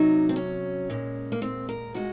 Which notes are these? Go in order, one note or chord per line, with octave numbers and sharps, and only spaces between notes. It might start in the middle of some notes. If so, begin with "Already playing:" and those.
Already playing: C3 F#3 D#4
C4
C#4
A#2 G#3
A#3
C4
A#4
A#2 G#3 F#4